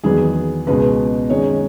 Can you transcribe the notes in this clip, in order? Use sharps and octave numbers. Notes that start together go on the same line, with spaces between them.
E2 D#3 F#3 B3 G#4
C#2 B2 G#3 B4
F#2 D#3 G#3 C#5